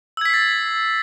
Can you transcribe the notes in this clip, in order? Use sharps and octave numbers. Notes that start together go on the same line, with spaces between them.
E6 G#6 A6 B6 C7